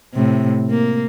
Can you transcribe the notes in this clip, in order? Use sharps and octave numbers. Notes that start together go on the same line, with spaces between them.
A2 C3
A#3